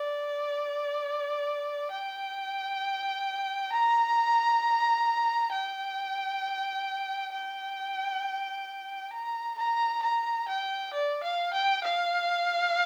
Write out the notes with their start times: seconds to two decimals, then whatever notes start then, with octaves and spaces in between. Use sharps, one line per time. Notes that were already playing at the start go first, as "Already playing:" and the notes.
Already playing: D5
1.91 G5
3.72 A#5
5.52 G5
7.33 G5
9.12 A#5
9.58 A#5
10.02 A#5
10.48 G5
10.93 D5
11.23 F5
11.53 G5
11.83 F5